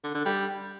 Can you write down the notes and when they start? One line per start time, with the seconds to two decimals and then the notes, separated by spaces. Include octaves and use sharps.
0.04 D3
0.15 D3
0.25 G3